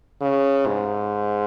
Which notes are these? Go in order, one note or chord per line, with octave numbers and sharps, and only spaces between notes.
C#3
G#2